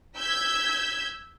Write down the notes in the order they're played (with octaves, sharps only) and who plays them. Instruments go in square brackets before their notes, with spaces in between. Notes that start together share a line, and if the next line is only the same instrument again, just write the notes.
[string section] E6 G6 G#6 B6